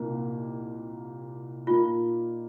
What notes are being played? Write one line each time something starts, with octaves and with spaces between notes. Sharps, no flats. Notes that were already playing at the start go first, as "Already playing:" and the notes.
Already playing: C2 A#2 A#3 D#4
A#2 A#3 D#4 F4